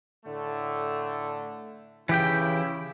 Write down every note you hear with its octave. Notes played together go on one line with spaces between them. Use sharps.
A2 D3 A3
C#3 E3 E4 G4 G5